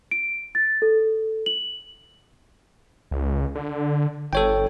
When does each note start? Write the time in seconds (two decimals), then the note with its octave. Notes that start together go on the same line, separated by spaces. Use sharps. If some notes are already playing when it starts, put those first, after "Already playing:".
0.11 D7
0.55 A6
0.82 A4
1.46 F#7
3.11 C#2
3.55 D3
4.33 G1 A4 C#5 G5